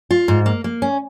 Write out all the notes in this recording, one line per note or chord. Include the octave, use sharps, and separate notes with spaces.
F4
G#2
A#3
A#3
C#4